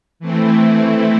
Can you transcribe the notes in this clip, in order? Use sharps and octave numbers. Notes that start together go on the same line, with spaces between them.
E3 A3 C4 E4